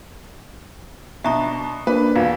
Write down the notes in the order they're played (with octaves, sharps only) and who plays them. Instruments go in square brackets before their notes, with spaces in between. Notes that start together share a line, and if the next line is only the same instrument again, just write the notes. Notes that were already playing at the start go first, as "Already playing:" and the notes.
[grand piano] B2 D4 [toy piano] E5 A#5 C#6
[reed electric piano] A#3 D4 [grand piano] B4
[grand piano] E1 [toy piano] F5